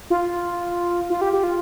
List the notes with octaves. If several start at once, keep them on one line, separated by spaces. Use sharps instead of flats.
F4
F4
G4
G4
F4